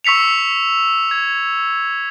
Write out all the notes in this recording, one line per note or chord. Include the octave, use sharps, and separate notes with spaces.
C#6 E6 B6 C#7 F7
G#6